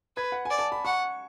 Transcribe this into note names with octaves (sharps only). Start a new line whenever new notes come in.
B4 G#6
F#5
G#5
D5
A5
B5
F#5 C#6